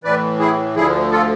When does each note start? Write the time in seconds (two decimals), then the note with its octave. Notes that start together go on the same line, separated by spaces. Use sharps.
0.04 A2 E3 B4 D5
0.39 E4 G#4
0.75 D2 D3 F3 E4 G#4
1.11 F4 A4